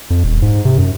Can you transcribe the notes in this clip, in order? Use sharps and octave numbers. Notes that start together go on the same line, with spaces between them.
F2
D#1
G#2
C3
F#2